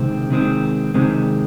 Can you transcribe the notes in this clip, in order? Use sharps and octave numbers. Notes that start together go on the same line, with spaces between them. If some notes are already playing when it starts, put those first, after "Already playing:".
Already playing: C3 D#3 G#3 C4
C3 D#3 G#3 C4
C3 D#3 G#3 C4